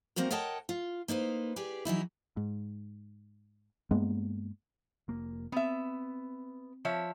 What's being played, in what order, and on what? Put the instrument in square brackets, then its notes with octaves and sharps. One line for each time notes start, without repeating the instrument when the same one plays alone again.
[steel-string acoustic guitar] G3 A#3 C4 F#4 A#4
A#4 C#5 D#5 F#5 G5 A5
F4
A#3 D#4 B4 C5
G4 G#4 B4 D5
E3 F#3 D#4 E4
[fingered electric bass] G#2
G2 G#3 A#3 B3
[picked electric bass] F1 A#3
[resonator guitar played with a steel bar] B3 E5 [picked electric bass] C4
[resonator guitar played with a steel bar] F3 C#5 E5